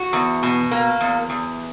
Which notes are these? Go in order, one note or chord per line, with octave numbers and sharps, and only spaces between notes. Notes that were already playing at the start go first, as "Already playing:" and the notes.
Already playing: F#4
E2
B2
A#3
E2
E2